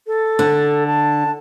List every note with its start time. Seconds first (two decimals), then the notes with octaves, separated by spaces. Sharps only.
0.07 A4
0.39 D3
0.87 A5